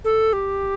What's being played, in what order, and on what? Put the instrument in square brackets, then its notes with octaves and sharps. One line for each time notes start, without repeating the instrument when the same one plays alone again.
[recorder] A4
G4